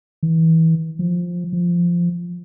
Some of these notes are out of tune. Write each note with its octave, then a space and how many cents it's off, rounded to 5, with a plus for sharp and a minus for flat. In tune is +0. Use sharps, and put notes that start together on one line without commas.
E3 -25
F3 +10
F3 -10